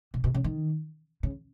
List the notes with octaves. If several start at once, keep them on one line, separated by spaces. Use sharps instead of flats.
B2
B2
C#3
D#3
C#3